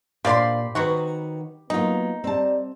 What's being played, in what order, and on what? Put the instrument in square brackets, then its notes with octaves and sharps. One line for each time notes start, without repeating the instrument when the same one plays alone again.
[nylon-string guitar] A#2 F5 [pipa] F3 D4 D5 [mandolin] G4 B5 C6
[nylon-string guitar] D#3 B4 [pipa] F#3 C4 F#4
[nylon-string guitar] F#3 F4 [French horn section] A#3 B3 [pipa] D#4
[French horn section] G3 D5 [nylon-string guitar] C4 A5